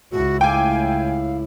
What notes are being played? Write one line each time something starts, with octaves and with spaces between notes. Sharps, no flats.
C#2 E4 F#4
A2 F5 G5 G#5 D6